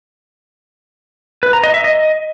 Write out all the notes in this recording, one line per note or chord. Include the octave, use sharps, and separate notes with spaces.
B4
A#5
D#5
E5
D#5